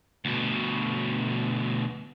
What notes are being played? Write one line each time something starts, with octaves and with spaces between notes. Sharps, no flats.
D2 B2